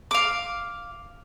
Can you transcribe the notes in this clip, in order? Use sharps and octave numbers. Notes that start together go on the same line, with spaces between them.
F5 D6